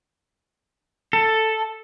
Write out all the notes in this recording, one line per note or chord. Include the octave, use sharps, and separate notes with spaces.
A4